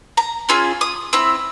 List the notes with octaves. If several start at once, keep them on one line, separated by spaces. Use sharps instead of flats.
A#5
C#4 F4 G#4 E6
D#6
C4 E4 E6